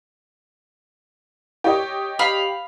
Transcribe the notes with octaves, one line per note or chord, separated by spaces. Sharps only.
G4 C#5 D#5
F5 B5